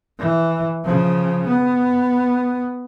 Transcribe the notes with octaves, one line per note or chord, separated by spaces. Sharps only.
E3
C#3 F3
B3